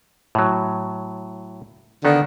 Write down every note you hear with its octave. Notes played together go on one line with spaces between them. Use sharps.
A2 F#3
D3 D#3 B3 D#4